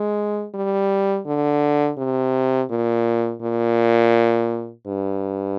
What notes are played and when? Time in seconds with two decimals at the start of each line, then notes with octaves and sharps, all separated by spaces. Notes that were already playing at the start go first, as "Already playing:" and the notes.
Already playing: G#3
0.54 G3
1.26 D3
1.98 C3
2.70 A#2
3.42 A#2
4.87 G2